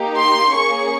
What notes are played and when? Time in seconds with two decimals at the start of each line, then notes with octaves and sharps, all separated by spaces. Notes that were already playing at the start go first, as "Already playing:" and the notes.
Already playing: A#3 D#4 G4
0.17 C6
0.53 A#3 C#4 G#4 C#6